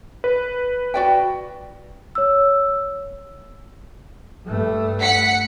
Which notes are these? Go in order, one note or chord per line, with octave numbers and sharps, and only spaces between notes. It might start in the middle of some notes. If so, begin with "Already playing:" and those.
B4
F#4 D5 G5
C#5 E6
G2 A3
F#5 B6 C#7